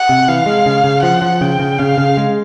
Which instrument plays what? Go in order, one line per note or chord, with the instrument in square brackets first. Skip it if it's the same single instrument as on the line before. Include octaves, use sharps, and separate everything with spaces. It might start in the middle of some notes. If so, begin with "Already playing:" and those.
Already playing: [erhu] F#5
[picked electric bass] C3
[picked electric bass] E3 [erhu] F5
[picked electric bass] G#3
C#3
C#3
[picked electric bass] F3 [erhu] F#5
[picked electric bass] F3
[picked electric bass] C#3 [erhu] G5
[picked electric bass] C#3
[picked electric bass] C#3 [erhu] F5
[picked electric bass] C#3
G#3